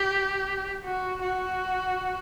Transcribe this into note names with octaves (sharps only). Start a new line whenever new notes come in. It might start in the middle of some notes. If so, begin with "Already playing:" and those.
Already playing: G4
F#4
F#4